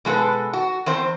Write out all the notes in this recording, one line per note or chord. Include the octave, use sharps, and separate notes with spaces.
B2 G#3 F4 A4 B4
F#4
E2 C4 C5